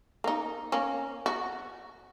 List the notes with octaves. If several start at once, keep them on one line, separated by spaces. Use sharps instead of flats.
A#3 D#4
A#3 C#4
F#4